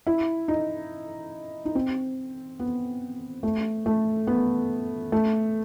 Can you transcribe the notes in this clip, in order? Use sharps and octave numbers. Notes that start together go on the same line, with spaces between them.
E4
D#4
D#4
C4
B3
A3
A3
B3
A3